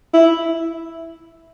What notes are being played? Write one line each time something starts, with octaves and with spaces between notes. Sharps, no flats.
E4